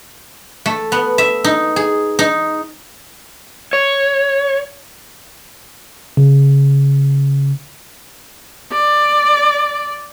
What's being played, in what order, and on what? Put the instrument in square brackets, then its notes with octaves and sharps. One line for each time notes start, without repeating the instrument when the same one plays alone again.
[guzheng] A3
B3
E5
D#4
G#4
D#4
[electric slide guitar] C#5
[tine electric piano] C#3
[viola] D5